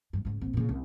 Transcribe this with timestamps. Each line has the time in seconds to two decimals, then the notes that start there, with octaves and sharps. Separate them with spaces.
0.13 G2
0.25 G#2 C#3
0.41 A#1 C4
0.53 A#2 C#3
0.69 C2